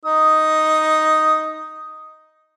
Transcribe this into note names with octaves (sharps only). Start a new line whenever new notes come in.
D#4 D#6